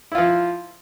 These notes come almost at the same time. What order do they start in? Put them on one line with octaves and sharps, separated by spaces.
E4 F4 F3